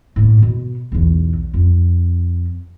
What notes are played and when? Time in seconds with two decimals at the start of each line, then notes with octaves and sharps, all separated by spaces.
0.16 A2 A#3
0.42 B2
0.92 B1 E2
1.54 F2